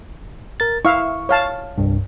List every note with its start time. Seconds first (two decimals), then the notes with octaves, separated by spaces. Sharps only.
0.60 A#4 A6
0.85 E4 E5 F5 C#6
1.29 C#5 F5 A5
1.78 C2 G2